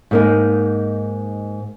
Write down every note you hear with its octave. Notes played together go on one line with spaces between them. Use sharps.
G#2 A#3 D#4